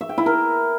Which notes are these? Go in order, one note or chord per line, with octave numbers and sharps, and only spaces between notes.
E5
G5
E4
A#4